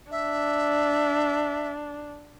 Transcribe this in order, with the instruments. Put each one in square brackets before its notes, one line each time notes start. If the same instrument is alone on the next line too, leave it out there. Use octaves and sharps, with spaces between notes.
[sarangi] D4 [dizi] E5